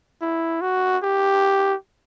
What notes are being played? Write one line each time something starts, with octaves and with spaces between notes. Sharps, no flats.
E4
F#4
G4